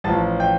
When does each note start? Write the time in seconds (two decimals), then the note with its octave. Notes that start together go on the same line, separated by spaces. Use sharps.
0.04 A1 A2 F3 A5 A6
0.40 G5 G6